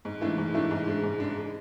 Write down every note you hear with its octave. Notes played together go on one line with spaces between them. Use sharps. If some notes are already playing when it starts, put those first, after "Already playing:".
G#2
E3 A3 D4
G#2
E3 A3 D4
G#2
G#3 D4
G#2
G#3 D4